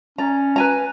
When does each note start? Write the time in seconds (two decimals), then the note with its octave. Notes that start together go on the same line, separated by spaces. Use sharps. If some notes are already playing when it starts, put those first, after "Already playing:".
0.18 C#4 D5 A#5
0.56 B4 G#5 A#5